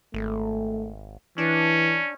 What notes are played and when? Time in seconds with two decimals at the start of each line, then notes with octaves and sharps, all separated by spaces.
0.14 G#1 A3
1.38 E3 C#4 D4